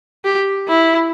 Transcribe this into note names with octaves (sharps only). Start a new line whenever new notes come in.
G4
E4